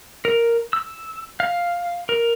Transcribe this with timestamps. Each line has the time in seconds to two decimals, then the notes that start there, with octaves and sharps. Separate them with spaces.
0.25 A#4
0.73 E6
1.40 F5
2.09 A#4